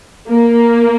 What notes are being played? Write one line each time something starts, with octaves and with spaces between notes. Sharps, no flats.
A#3